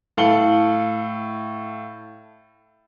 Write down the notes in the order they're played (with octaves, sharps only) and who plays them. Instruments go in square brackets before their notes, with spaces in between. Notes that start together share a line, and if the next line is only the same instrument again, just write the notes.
[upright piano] A2 A4 F5 C#7 F#7 G7